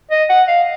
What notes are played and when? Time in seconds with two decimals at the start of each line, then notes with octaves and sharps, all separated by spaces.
0.11 D#5
0.29 F#5
0.48 F5